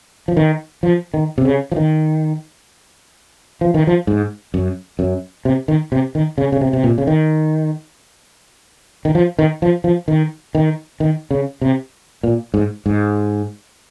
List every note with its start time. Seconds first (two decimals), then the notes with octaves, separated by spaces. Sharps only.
0.28 F3
0.37 D#3
0.83 F3
1.14 D#3
1.38 C3
1.45 C#3
1.72 F3
1.76 D#3
3.61 F3
3.74 D#3
3.87 F3
4.07 G#2
4.54 F#2
4.99 F#2
5.45 C3
5.68 D#3
5.92 C3
6.15 D#3
6.38 C#3
6.52 C#3
6.61 C3
6.73 C3
6.84 A#2
6.98 C#3
7.07 D#3
9.05 D#3
9.15 F3
9.39 D#3
9.62 F3
9.84 F3
10.08 D#3
10.55 D#3
11.00 D#3
11.31 C#3
11.61 C3
12.23 A#2
12.54 G#2
12.86 G#2